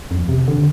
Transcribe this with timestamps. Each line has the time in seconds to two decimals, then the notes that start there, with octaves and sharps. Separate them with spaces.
0.11 F2
0.29 C3
0.48 D3